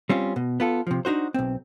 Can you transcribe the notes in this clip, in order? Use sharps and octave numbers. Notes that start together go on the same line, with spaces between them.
G3 C4 C#4 F4
B2
B3 F4 A4
C3 F3
D4 D#4 F#4 C5
B1 C4